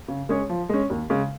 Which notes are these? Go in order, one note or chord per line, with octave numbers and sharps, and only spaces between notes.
C#3
G#3 C#4 G#4 C#5
F3
G#3 C#4
D#2
C#3 G#3